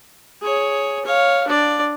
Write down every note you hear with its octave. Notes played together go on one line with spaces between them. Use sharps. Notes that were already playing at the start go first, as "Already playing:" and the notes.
G#4 C#5
C#5 F5
D4 D5